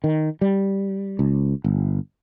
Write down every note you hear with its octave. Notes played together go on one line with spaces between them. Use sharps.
D#3
G3
C#2
G1